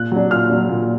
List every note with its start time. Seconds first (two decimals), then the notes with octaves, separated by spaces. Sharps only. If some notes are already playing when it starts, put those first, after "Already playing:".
Already playing: A#2 F#6
0.12 F#3 D4
0.31 A#2 F6
0.50 F#3 D4
0.69 A#2